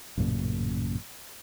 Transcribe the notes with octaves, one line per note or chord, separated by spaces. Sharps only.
A1 F#2 A#2 C#3